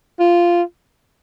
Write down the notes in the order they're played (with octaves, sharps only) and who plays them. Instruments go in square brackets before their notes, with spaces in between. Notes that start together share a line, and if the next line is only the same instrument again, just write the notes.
[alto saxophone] F4